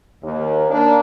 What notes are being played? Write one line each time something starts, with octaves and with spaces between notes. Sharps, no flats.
D#2
A#3 D4